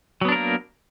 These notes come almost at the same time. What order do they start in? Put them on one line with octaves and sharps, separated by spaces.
F#3 B3 D4 A#4 A#3